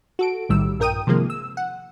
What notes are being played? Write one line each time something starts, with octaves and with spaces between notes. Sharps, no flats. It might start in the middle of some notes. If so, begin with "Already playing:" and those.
F#4 A4 D7
B1 A2 D#3 G3 E6
A#1 G2 A#4 G5 D#6 D#7
C3 D#3 F3 G#3 A#3
E6
F#5